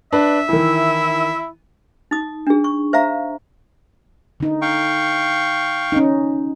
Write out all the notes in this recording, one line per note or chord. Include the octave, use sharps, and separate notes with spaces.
D4 B4 E5
D#3 E3 E4
D#4 D#6
D4 G#4
C#6
C5 E5 F5 A#5
D3 D#4
F5 G5 C#6
C#4 D#4